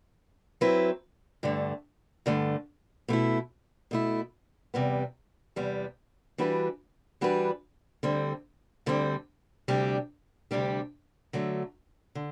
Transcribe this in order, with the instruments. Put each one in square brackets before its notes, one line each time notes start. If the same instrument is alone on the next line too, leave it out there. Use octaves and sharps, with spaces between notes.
[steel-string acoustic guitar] F#3 C4 E4 B4
G2 D3 A3
G2 D3 A3
B2 A3 E4
B2 A3 E4
E2 C3 G3 B3
E2 C3 G3 B3
E3 G3 D4 F#4 B4
E3 G3 D4 F#4 B4
D2 D3 G3 C4
D2 D3 G3 C4
D2 C3 G3 D4 G4
D2 C3 G3 D4 G4
D3 F#3 A3
D3